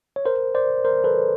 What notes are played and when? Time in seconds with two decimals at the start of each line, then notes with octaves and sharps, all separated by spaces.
0.16 C#5
0.26 A#4 C5
0.55 C5 D5
0.85 A#4 C5
1.04 A4 B4